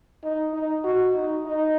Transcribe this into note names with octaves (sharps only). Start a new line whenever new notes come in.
D#4
D#4
F#4
D#4
D#4